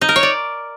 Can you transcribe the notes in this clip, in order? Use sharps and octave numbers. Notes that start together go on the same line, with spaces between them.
D#4
A#4
C#5
D5